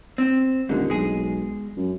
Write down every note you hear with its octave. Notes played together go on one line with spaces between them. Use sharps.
C4
D#1 G#2 D3
B1 G#3 G#4
F#2